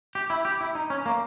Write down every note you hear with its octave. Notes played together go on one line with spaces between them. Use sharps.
G4
E4
G4
E4
D#4
C#4
A#3